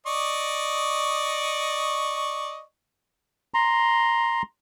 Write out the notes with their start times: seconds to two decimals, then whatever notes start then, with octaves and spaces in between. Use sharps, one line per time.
0.06 D5 D#5 C#6
3.54 A#5 C6